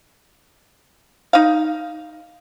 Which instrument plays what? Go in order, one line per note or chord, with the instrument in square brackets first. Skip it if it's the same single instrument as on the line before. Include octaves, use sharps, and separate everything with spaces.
[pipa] D#4 F5